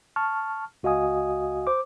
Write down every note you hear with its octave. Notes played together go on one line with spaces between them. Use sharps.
A5 C#6 F6
C#2 F#4 D#5 F5 G#5 D#6
C5 D6